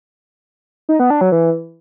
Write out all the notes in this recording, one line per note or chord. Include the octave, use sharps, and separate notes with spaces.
D#4
B3
D4
F#3
E3